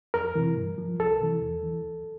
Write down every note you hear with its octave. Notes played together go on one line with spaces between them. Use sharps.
F2 A#4
C3 E3
G2
F3
C2 A4
C3 E3
E2
E3
D2